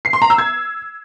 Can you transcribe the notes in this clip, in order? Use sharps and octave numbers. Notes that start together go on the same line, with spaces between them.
C7
C6
A#5
E6
G#6